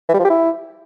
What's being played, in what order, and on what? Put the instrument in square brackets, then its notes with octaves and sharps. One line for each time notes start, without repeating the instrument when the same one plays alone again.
[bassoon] E3
G3
F3
G4
E4